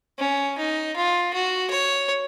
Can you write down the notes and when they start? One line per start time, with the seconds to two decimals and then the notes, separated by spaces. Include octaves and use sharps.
0.19 C#4
0.58 D#4
0.96 F4
1.34 F#4
1.71 C#5